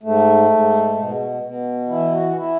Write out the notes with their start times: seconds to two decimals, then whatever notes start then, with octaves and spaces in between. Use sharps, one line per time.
0.03 G#2 A3
0.50 G#2
0.96 B2
1.43 B2
1.89 E3 E4
2.12 F#4
2.36 E3 E4